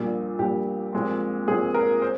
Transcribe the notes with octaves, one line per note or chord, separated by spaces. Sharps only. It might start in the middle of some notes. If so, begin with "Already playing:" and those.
Already playing: A#1 A#2 G3 D4
A#1 A#2 G3 D4 G4
A#1 A#2 G#3 C4
A#1 A#2 G#3 C4 G#4
A#4
C5